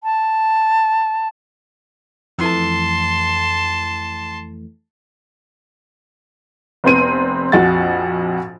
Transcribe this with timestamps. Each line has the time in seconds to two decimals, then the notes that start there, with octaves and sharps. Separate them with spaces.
0.04 A5
2.38 F2 E3 A3 A5 C6
6.84 F1 B3 C4 D#7
7.52 A#1 F2 F#4 A6